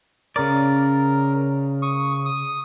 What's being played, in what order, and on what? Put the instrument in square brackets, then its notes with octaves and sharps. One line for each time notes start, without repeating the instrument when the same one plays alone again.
[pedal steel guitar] C#3 D5 [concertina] A#4
[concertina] C#6 D#6
D#6